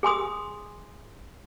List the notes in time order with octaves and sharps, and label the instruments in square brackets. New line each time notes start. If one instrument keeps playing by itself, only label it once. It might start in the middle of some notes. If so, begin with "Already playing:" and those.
[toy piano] G#4 G#5 C6 D#6